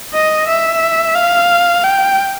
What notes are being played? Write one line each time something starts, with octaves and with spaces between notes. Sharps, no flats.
D#5
E5
F5
G5